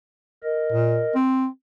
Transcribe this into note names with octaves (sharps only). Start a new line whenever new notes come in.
A#4 D#5
A#2
C4